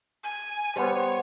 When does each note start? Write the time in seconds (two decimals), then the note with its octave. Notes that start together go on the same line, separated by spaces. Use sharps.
0.23 G#5
0.76 G3 B3 C5 C#5